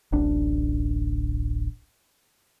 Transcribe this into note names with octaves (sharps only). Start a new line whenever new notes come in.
D1 A1 D4